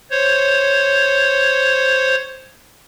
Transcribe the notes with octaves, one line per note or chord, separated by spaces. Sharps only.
C5 C#5